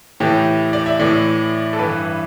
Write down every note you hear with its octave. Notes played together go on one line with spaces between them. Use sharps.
A2 E3 G4
D5
E5
A2 E3 D5
A4
G2 E3 B4